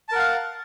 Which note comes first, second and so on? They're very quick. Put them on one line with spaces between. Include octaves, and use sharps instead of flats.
A5 A#4 F#5 F5